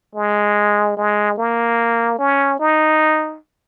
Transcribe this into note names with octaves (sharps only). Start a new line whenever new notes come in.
G#3
G#3
A#3
C#4
D#4